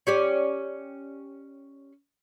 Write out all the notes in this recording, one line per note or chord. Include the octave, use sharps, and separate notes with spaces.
C#4 G4 D5